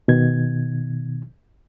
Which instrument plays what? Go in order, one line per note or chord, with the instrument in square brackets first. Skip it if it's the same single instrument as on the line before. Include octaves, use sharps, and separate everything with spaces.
[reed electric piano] B2 D#3 G#6